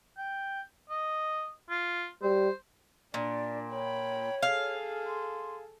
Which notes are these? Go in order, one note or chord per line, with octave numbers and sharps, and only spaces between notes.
G5
D#5
F4
G3 C5
A#2 D4 D5
C#5 G5 B5
G#4 A4 F5
C6